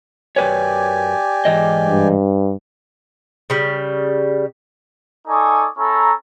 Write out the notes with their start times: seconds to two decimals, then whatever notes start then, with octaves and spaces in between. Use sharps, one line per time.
0.36 F#2 G4 B4 C#5 D5 G#5
1.45 G#2 E3 D#5
1.86 G2
3.50 C#3 G3
5.28 D#4 A4 D5 G#5 C#6 D#6
5.78 C#4 E4 A4 A#5